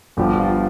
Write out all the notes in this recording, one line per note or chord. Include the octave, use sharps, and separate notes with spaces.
G1 G2 D3 F3 G4
F4